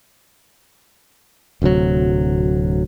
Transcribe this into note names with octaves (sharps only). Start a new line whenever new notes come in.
D1 D2 C3 F#3